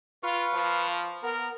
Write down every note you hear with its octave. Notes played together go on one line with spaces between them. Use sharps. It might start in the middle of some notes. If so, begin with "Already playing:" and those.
F4 B4 F5 C#6
F3
B3 A#4